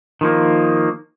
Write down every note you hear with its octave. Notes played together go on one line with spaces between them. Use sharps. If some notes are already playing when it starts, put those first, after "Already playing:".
D#3 F3 A#3